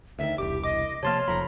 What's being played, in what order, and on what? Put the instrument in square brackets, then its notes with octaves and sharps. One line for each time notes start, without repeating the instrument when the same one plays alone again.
[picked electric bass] D2 D3 D#3 [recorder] E5
[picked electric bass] E1 C2 [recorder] G4 [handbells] D6
[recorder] D#5 [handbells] D6
[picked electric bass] C3 F3 A#3 [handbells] C#5 C6 F6 [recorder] A5
[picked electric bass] F1 F2 F3 [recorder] A#5 [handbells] B5